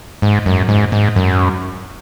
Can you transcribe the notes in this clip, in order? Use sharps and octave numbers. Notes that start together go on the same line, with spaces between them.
G#2
F#2
G#2
G#2
F#2